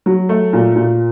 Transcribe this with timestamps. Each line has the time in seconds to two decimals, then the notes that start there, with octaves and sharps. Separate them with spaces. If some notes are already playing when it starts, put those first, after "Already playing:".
0.06 F#3
0.29 A3
0.53 A#2
0.75 A#2